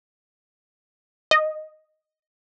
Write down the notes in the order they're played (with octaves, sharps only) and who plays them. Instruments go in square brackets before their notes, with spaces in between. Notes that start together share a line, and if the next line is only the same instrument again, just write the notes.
[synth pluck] D#5